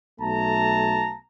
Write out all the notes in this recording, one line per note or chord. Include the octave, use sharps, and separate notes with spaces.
B1 A3 A5 A#5